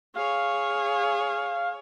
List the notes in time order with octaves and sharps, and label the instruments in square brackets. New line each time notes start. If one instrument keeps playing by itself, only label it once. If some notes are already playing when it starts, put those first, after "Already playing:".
[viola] G#4 C#5 [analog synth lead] F5